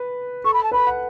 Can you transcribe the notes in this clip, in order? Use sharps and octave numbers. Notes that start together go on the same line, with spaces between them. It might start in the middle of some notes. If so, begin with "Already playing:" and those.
Already playing: B4
A4 C#6
B5
A5
B4 B5
F#5